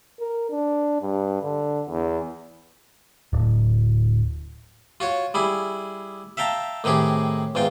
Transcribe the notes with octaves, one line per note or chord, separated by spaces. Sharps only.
A#4
D4
G2
D3
E2
D1
F4 F#4 C#5
G3 E4 G#4
E5 F5 G5 A5 A#5
A2 D#3 C4 G4 G#4
E2 G#2 F4 G5